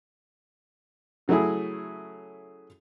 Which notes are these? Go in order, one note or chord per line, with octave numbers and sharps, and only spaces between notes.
C#3 F#3 A3 E4 G#4